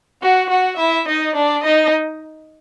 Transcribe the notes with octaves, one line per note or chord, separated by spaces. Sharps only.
F#4 F#5
F#4 F#5
E4 E5
D#4 D#5
D4 D5
D#4 D#5